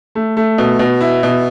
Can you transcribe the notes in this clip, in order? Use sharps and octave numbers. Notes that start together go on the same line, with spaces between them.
A3
A3
B2
B2
E4
B2